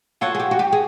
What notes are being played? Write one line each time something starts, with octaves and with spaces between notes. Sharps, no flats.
F4 F#4 A4 C#5 F#5
G#4
G4
F#4
G4
G#4